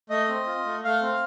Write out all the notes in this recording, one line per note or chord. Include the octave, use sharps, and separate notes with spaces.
A3 D#5
C4
F4
A3
A3 F5
C4